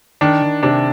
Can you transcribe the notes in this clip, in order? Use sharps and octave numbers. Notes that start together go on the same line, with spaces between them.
D#3 D4
D#3
C3 D4